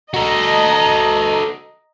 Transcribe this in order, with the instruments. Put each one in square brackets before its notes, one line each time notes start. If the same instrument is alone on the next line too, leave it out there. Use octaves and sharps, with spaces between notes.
[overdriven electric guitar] F#4 A4 [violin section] D#5 A#5